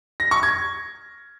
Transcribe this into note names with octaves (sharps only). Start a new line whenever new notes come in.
A#6
C#6
G#6